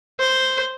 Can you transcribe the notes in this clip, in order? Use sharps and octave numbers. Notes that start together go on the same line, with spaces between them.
C5